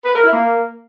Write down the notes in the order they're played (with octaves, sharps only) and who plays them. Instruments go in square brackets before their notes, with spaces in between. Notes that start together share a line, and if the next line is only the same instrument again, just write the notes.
[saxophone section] B4
A#4
E4
A#3